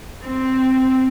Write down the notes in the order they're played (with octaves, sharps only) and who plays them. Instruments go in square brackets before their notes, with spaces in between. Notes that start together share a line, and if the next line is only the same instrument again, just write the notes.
[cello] C4